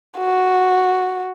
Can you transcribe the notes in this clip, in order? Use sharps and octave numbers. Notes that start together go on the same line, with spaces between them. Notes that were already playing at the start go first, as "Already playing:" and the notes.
F#4